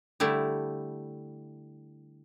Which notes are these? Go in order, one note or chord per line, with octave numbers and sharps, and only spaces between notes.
D3 G3 A3 E4 G4